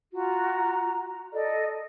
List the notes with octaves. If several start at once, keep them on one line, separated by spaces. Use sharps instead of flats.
F4 F#4 A#5
A4 D5 D#5